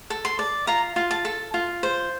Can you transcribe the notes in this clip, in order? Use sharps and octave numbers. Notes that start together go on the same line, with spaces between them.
A4
C6
D5
F4 A#5
F4
A5
A4
F4
C5